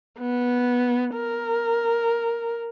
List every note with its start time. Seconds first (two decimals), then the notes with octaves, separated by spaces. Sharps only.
0.20 B3
1.16 A#4